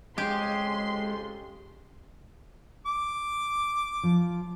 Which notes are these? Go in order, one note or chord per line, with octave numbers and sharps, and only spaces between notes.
F2 C#3 G#3 G4 C6
D6
F3